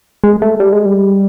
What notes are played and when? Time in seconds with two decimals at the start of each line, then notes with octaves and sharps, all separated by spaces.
0.24 G#3
0.42 A3
0.60 G3
0.72 G#3
0.86 G3